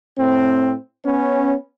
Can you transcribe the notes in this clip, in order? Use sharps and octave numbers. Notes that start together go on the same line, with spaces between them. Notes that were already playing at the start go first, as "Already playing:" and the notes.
A2 C4
B3 C#4